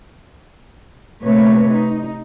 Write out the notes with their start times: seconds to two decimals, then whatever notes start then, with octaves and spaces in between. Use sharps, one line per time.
1.23 C3 A3 A#3 B4 C#5
1.72 D#4